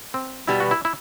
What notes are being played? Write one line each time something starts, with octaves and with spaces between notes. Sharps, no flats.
C4
B2 G3 B3 E4
F#4
E4
E4